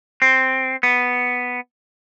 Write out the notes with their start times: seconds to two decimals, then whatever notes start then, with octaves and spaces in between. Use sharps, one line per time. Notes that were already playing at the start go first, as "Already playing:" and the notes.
0.22 C4
0.83 B3